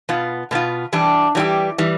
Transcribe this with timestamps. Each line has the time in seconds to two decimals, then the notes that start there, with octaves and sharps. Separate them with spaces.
0.09 B2 B3 F4
0.51 B2 B3 F4
0.93 E3 G3 D4 G4
1.35 E3 G3 D4 G4
1.78 E3 G3